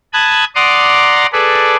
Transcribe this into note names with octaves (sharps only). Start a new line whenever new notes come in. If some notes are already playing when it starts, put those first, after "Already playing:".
A5 B5 D#6 F#6 G#6
D5 F#5 A#5 C6 D6 D#6
G#4 A4 B4 D5